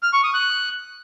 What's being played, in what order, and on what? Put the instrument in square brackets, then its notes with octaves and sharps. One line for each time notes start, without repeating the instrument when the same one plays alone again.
[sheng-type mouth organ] F6
C#6
D#6
F#6